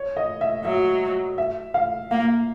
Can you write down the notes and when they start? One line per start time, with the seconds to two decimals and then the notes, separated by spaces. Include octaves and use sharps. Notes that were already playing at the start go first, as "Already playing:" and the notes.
Already playing: C#5
0.17 D#5
0.41 E5
0.65 F#3 E5
1.38 E5
1.74 F5
2.11 A#3 F5